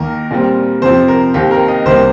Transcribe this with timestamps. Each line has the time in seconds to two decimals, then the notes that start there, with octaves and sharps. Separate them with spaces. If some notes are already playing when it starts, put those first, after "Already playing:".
Already playing: D#2 D#3 A#3 A#4
0.31 A#2 G3 C4
0.82 F2 C3 F3 C5
1.08 A#4
1.34 D#2 D#3 C4 G4
1.51 A#4
1.68 D#5
1.85 C2 C3 D#3 A#3 C5